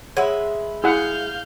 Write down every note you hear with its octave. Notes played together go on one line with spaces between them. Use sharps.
G#3 B4 C#5 E5 F#5
E4 G#4 F5 F#5 G6